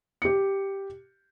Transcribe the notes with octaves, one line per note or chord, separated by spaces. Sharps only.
G4 C#7